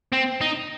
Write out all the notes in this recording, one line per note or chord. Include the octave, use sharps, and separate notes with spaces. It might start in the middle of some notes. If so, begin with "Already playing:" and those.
C4
D#4